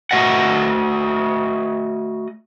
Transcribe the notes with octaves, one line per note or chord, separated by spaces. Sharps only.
A3 F#4 D#5 F#5